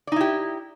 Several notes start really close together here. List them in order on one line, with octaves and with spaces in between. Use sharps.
D5 D#4 E4 G4